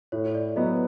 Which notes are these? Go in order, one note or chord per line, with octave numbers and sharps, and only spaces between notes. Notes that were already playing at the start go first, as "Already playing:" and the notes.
A2 C#5
D5
F#3 B3 D#5